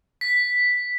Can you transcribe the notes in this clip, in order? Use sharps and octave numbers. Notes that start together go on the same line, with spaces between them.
B6